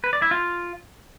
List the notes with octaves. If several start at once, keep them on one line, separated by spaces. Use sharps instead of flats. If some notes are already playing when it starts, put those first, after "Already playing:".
B4
D5
E4
F4